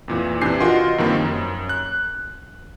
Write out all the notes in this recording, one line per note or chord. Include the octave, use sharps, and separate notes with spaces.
F2 A#2 E3
C3 E3 D4 G#5 G6 C7
F4 F#4 A#4 D#5 F#5 C6
G2 D#3 F3 A#3 C4
F#2
F#6